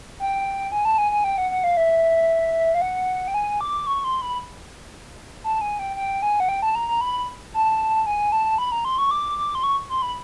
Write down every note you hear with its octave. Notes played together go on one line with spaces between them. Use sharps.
G5
G#5
A5
G#5
G#5
G5
F#5
F#5
F5
E5
F5
F#5
G5
G#5
D6
C#6
C6
B5
A5
G#5
G5
G5
G#5
F#5
G5
A5
A#5
A#5
B5
A5
G#5
A5
B5
A#5
C6
C#6
D6
D6
C6
C#6
C6
B5